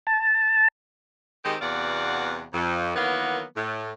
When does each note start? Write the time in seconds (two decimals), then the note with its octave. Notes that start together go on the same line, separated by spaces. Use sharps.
0.07 A5
1.45 D#3 G#3 C4 D#4 G4
1.61 E2 C3 B3 F#4 D5 F5
2.53 F2
2.95 D#3 E3 F#3 A#3 B3
3.57 A2